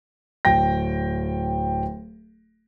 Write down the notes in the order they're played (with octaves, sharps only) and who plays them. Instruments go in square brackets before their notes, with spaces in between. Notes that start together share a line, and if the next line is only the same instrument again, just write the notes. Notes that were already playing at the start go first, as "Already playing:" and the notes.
[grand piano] D1 G5 A#6